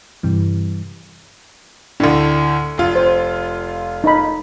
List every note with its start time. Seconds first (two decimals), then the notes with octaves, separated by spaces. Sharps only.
0.23 G2 C3 E3 G3
2.00 D2 A2 D4
2.78 F1 F4
2.96 C5
4.04 D#4 D#5 B5